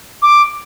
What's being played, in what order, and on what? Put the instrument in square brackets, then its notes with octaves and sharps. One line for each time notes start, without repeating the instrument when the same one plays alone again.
[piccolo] D6